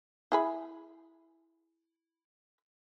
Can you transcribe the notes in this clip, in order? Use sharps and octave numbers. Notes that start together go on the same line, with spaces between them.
E4 G#4 B5